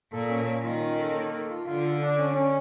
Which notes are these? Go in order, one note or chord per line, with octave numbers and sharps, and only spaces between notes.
A#2 A4
C#4
C#4
D#3 F4
C#4
A4
A#3
A4
F4
D3 F4
A4
D4
C#4
C#4